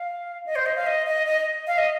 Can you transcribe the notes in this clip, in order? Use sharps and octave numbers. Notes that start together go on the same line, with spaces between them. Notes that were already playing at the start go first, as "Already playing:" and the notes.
Already playing: F5
D#5
C5
D#5
F5
D#5
D#5
D#5
F5
D#5